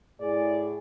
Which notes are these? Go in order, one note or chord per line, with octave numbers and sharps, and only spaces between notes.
A2 G#4 D5